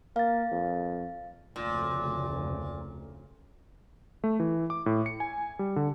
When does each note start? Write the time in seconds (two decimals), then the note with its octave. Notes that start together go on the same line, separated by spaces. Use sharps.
0.16 A#3 F5 A6
0.52 F2
1.56 F1 D2 A#2 C#3
4.24 A3
4.40 E3
4.70 D6
4.86 A2
5.06 C#7
5.20 G#5
5.59 G3
5.76 D3